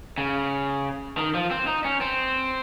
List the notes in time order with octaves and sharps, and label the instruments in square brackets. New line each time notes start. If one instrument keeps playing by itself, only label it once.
[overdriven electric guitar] C#3
D#3
F3
C4
D#4
C#4
C4